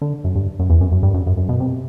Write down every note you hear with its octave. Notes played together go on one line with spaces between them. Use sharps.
D3
F#2
G2
F#2
E2
F#2
F#2
G2
F#2
F#2
F#2
B2
C3